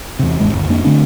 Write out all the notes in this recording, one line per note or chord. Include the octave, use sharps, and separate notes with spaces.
E2 C3
D#1 G#1 G#3
G1 D#2
F2 A#3 D4
D3 A3 C4 D4